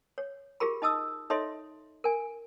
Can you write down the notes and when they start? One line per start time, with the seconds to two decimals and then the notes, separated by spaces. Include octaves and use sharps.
0.18 C#5
0.60 F4 G4 G#4 A#4 B5
0.82 D#4 D#5 A5 D#6 E6
1.30 D#4 A4 C#5 D#5 E5 C6
2.04 A#4 G#5